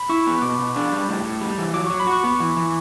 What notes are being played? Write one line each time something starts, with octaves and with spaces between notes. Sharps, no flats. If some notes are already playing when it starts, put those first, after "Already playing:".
Already playing: B5
E4 C#6
B3
B2 D6
B2
D4
G3
A2
A2
G3
E3
F#3 D6
F#3 C#6
B5
F#4
C#6
B3
E3
E3